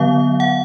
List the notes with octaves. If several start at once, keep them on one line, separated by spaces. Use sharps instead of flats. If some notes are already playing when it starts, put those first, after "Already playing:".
Already playing: D3 F#3 B3 F5
F#5